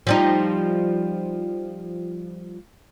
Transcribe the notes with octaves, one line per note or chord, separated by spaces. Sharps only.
F3 G3 D#4